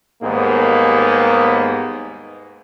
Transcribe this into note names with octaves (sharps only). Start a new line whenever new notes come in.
D#2 G#2 G3 A#3 B3